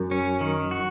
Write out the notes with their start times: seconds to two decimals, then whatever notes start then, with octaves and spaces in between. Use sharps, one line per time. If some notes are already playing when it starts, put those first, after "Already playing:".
Already playing: F#2
0.11 C#4
0.41 D#3
0.71 F#4